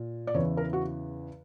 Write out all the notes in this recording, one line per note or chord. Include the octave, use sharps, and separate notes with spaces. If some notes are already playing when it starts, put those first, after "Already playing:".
Already playing: A#2
D5
E2 C#3 E3 C#5
A#4
F#4